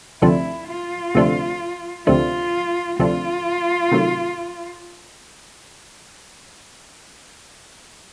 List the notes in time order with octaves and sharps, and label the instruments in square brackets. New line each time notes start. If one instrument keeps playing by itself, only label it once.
[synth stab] D2 C3 F3 A3 D4 [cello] E4
[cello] F4
[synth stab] D2 C3 F3 A3 D4
[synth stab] D2 C3 F3 A3 D4 [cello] F4
[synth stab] D2 C3 F3 A3 D4 [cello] F4
[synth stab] C3 D#3 F#3 A3